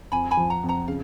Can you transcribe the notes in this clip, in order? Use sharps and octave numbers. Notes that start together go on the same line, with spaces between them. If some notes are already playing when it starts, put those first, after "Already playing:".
F2 G#5 B5
G#5 B5
F3
F#5 A#5
F2
F#5 A#5
C#3 F5